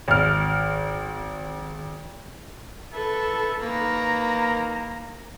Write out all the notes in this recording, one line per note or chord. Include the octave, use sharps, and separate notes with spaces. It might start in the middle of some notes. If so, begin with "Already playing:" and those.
G#1 F6
A4 B4 E5
D#3 A#3 A#4 B4 A#5